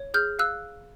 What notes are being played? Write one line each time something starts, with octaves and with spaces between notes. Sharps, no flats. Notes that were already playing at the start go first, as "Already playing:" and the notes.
Already playing: C#5
G#4 F6 G6
F5 E6 F#6